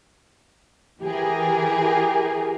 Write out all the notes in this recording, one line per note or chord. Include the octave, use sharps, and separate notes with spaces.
E3 G4 G#4 A#4